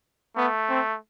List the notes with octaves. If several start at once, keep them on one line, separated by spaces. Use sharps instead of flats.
A3 B3
C4